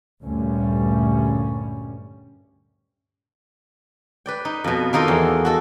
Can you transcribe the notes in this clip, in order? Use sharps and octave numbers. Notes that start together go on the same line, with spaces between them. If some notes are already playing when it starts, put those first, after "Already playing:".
D2 G2 A#2 G3 C#4
B4 D5 G5
D#4
F2 B2
D#3 A#3 D#4 F4 A4
E2
F#4 A4 D#5